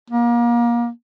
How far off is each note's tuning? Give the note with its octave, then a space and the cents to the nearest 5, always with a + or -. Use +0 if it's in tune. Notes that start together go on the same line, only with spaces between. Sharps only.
A#3 +30